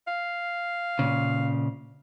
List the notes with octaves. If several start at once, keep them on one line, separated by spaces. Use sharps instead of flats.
F5
A#2 C#3